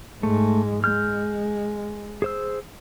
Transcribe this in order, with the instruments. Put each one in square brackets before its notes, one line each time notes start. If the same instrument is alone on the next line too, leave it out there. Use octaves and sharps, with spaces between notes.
[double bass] G#2 G#3 [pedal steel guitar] A3
[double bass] G#3 [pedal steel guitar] F6 G6
[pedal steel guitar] G#4 C5 E6